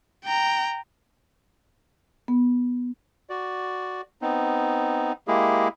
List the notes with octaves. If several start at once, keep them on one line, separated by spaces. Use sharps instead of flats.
G5 A#5
B3
F#4 D5
B3 C4 D#4
G#3 A#3 E4 G4 G#4